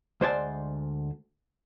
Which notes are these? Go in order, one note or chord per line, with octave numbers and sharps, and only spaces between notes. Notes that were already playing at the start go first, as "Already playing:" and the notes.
D2 G#3 C5 D5 G#5 A5